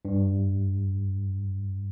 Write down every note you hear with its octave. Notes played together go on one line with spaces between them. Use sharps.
G2